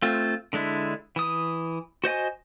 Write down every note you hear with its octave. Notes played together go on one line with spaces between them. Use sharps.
A3 C4 F4
D3 G#3 D4 E4
E3 D#6
F#4 C5 D#5 G#5